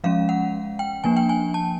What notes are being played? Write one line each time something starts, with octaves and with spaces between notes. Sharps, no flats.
F3 G#3 C#4 F5
F#5
G5
F3 A#3 D4 G#5
G5
G#5
A5